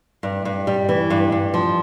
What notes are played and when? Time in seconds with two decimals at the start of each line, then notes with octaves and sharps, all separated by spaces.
0.23 G2
0.45 G2
0.67 G3
0.89 E3
1.10 G2
1.32 G2
1.54 F3